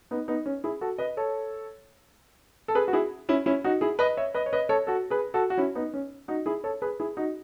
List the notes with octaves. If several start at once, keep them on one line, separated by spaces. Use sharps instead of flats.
B3 D#4
B3 D#4
C#4
E4 G#4
F#4 A4
B4 D#5
A4 C#5
A4
G#4 B4
F#4
E4 G#4
C#4 E4
C#4 E4
D#4 F#4
E4 G#4
B4 D#5
C#5 E5
B4 D#5
C#5
B4 D#5
A4 C#5
F#4 A4
G#4 B4
F#4 A4
F#4
C#4 E4
B3 D#4
C#4
D#4 F#4
E4 G#4
A4 C#5
G#4 B4
E4 G#4
D#4 F#4